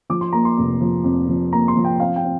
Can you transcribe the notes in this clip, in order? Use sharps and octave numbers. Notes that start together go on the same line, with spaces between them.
F3 D6
C6
A#3 A#5
C6
F1
F3
F2
F3
A#3 A#5
C6
F3
G5
C4 F5
G5
C4